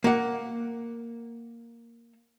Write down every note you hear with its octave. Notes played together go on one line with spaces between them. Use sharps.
A#3 F#5